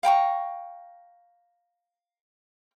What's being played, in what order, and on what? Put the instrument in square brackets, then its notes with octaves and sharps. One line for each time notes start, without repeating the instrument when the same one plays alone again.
[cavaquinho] F5 G5 A#5 C#6